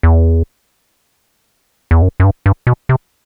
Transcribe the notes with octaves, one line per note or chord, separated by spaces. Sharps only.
E2
E2
F#2
F#2
G2
G2
B2
C3